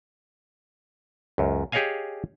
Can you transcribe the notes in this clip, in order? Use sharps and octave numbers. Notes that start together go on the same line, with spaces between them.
C#2 F#2
G4 G#4 C#5 D#5 F5 G#5